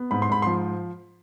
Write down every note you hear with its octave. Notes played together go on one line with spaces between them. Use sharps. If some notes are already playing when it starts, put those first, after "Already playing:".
Already playing: B3
G#2 B5
C6
G#2 B5
F3 C6